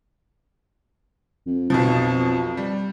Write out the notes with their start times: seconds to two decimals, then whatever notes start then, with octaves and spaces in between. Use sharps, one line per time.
1.46 F2
1.70 B1 F2 B2 F3
2.57 G3